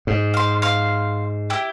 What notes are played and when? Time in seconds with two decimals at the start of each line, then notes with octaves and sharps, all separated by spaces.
0.07 G#2
0.34 F5 C6
0.62 F5 C6
1.50 E4 G4